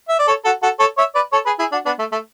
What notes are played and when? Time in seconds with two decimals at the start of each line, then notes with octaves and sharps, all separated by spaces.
0.09 E5
0.19 D5
0.27 A4 C#5
0.45 F#4 A4
0.63 F#4 A4
0.80 A4 C#5
0.97 C#5 E5
1.15 B4 D5
1.32 A4 C#5
1.46 G#4 B4
1.59 E4 G#4
1.72 D4 F#4
1.86 B3 D4
1.99 A3
2.12 A3